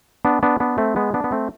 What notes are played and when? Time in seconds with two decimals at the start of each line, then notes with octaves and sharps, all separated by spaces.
0.25 B3 D4
0.43 B3 D4
0.60 B3 D4
0.78 A3 C4
0.96 G#3 B3
1.14 B3 D4
1.24 B3
1.32 A3 C4